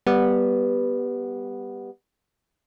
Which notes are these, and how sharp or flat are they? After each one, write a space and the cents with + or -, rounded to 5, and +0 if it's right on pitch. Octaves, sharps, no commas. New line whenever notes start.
G3 +10 B3 -5